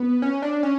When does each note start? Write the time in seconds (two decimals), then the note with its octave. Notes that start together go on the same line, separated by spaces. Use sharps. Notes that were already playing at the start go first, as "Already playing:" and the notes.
Already playing: B3
0.22 C#4
0.42 D4
0.63 C#4